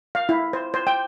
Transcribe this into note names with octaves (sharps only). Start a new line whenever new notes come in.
F5
E4
C5
C5
G5